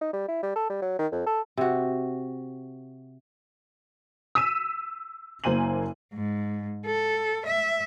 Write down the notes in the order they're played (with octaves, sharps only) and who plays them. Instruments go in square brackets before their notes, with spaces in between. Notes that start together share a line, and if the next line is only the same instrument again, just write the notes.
[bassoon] D#4
G3
E4
G3
A4
G3
F#3
D#3
F2
A4
[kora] C3 F#4
[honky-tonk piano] E6 B6 D#7 E7
F#1 A#3 C5 G#5 D#7 F#7
[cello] G#2
A4
E5